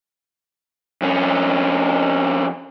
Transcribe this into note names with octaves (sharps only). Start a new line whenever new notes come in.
F2 C#4